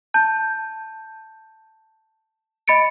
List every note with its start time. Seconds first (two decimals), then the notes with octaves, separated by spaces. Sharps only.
0.14 A5 G6
2.68 D#5 B5 A6 C#7 D7